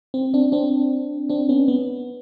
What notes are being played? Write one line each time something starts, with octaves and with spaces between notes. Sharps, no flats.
C4
C4 D4
C4 D4
C4 D4
B3 C#4
B3